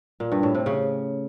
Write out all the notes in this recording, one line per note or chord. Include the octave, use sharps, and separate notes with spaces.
A#2
G2
A2
C3
C#3